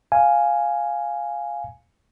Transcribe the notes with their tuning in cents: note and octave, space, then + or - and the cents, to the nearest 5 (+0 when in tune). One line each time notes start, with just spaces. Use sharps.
F5 +0 G#5 +0